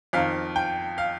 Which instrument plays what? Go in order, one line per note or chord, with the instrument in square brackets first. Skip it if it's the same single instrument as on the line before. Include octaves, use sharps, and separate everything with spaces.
[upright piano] F2 D#3 F5
G5
F5